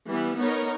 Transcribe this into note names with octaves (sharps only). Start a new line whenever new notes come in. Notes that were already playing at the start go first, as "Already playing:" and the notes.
E3 G3 B3
B3 D#4 A#4 C#5